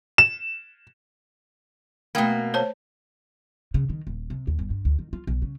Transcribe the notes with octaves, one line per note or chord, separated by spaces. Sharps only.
E7
B2 A3 A#3 G5 B5
C5 C#5 A5
C#3
D#3
D#1
C3
D#2
G1
G2
D2
D#3
F4
B1
C#3